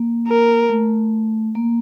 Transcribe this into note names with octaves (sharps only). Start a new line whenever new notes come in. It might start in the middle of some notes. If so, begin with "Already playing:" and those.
Already playing: A#3
A#4
A3
A#3